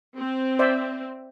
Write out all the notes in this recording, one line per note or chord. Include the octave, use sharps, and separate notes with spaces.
C4
C5 D5 E5